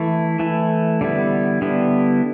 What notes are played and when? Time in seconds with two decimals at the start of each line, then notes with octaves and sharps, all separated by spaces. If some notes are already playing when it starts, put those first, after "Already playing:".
Already playing: E3 A3 E4
0.39 E3 A3 E4
1.01 D3 G3 B3 E4
1.62 D3 G3 B3 E4